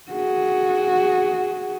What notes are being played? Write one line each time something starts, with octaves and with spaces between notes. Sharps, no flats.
F#4 G#4